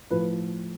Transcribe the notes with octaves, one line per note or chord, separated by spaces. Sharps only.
A2 F3 B4